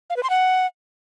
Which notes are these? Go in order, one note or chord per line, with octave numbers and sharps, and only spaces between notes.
F5
B4
C6
F#5